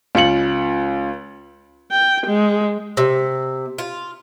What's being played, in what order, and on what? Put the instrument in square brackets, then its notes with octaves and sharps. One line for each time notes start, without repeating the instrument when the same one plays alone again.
[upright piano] C#2 F4 C#7 F#7
[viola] G5
G#3
[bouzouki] C3
F4